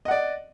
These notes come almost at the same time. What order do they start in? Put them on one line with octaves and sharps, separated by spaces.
D#5 F#5 D5